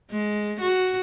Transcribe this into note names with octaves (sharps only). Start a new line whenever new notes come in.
G#3
F#4